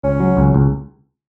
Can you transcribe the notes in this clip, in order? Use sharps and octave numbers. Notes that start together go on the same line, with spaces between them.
C#2 C#4
F#3
C#2
C#2